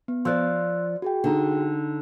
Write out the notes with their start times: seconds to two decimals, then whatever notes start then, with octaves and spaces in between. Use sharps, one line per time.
0.08 B3
0.25 F3 D5 C6 E6 F#6
1.02 F#4 G#4 G5
1.24 D3 D#4